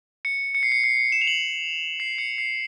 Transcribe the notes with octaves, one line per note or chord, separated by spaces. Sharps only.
C#7
C#7
C7
C#7
C7
C#7
E7
F7
F#7
C7
C#7
C7